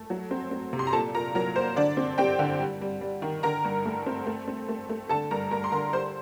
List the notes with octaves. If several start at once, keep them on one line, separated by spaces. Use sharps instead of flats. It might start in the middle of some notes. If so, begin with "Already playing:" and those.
Already playing: A3
F#3
C4
C4
C3
C6
A#5
A#2 A4 A5
A#2 A#4 A#5
F#3 A#4 A#5
A#3 C5
D3 D4 D5
C4
C4 G4 G5
D3
G3
G3
G3
D#3
D3 A#4 A#5
G2
A3
C4
A3
C4
A3
A3
D3 A4 A5
G2 A#4 A#5
G2 A#4 A#5
C6
D3 A#4 A#5
G3 C5 C6